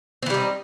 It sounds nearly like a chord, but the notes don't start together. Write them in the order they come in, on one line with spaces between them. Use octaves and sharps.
C4 E3 G3 D#4